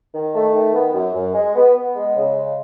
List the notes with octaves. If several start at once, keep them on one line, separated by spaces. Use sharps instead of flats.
D#3
A3
D#3
B3
F#2
F#2
G#3
B3
B3
G#3
C#3
G#3